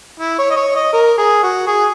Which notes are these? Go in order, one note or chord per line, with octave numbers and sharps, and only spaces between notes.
E4
C#5
D#5
C#5
D#5
A#4
G#4
F#4
G#4